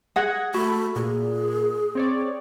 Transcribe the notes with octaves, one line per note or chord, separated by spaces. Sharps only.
G#4 F#5 F#6 G#6 A#6
A3 F#4 B5
A#2 G#4
C4 C#5 D5